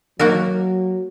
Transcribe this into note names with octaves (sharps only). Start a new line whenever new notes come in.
F#3 A#3 F#4 A#4